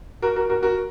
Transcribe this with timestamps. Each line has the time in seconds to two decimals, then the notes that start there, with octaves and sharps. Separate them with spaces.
0.22 F#4 A#4
0.36 F#4 A#4
0.49 F#4 A#4
0.63 F#4 A#4